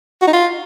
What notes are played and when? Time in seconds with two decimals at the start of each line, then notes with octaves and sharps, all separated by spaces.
0.21 F#4
0.27 D#4
0.33 F4